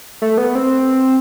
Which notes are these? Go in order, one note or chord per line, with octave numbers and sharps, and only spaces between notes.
A3
B3
C4